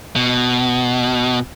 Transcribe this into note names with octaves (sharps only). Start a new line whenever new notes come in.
B2